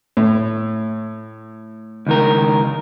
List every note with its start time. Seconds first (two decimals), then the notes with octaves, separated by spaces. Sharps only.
0.17 A2
2.07 C#2 D#3 A#4